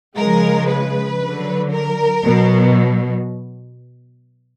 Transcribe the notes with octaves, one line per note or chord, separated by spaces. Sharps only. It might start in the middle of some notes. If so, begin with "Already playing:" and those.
C#3 F3 G#3 A#4
B4
D3 F#3
A#4
B2 F#3